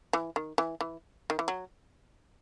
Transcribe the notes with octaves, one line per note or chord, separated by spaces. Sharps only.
E3
D#3
E3
E3
D#3
E3
F#3